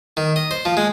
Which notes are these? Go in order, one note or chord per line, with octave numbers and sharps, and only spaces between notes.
D#3
D#5
C5
F3
G#3